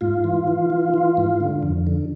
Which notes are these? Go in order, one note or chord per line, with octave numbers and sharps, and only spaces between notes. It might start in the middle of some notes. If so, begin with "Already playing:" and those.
G#2 F4
E3
E3
E3
E3
G#2
D3
F2
D3